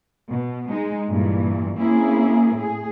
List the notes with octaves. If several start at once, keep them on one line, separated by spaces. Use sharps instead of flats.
B2
G#3 D#4
G2 A#2 E3
A#3 C4 C#4 E4 G#4
A2 G#4